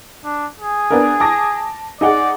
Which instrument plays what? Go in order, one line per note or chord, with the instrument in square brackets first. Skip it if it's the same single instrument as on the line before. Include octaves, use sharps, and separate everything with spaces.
[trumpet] D4
G#4
[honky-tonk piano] B3 D4 A#4
A5 D6 A#6
[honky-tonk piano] D#4 G#4 F#5 [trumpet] D5